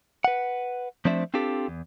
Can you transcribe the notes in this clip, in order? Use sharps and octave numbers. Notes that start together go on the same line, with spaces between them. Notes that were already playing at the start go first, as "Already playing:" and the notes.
B4 F#5
F3 A3 C4 D4 C5 E5
C4 D4 F4 G4 A4
E2